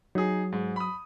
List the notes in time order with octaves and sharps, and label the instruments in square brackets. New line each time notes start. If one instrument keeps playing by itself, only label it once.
[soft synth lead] F#3 [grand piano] D#4 G#4
[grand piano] G#2
B5 D#6